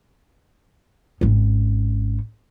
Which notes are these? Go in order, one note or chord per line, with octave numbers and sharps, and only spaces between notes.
G#1 C#4